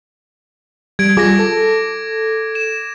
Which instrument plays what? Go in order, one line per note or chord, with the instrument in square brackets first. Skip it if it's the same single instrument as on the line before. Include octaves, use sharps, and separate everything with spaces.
[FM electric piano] G3 [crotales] G#6 D7
[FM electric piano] G3 F4 G#4 [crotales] D6 A#6
[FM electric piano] A4
[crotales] E7